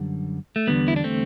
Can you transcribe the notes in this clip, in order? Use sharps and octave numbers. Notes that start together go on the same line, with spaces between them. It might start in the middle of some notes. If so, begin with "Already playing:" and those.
Already playing: F#2 D3 G3
A3
E2 D3 G3 B3
E4
D4
A3 C4